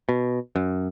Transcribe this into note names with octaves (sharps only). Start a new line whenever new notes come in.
B2
F#2